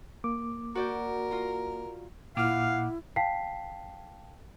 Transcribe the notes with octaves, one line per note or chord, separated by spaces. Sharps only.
A#3 D6
F#4 A#4 D5 G6
F4 A#5
A#2 E4 F5 F#5 D6 F6
F5 G5 A5 B6 C7